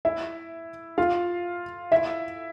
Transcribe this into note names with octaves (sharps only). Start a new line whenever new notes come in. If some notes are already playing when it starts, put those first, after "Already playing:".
E4 E5
F4 F5
E4 E5